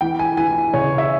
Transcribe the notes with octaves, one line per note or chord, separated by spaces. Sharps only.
E3 G5
G#5
E3 G#5
C#3 C#5
E5